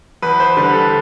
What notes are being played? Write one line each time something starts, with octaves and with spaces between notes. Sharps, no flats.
E2 B4
C5
D3 G3 B4
A4